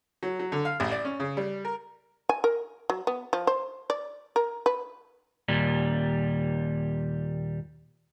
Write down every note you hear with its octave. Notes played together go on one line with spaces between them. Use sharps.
F#3
F#3
D3
F5
A1
D5
C#4
C#3
G3
A#4
G#5
A#4
F#3
B3
F3
C5
D5
A#4
B4
D#2 A#2 G3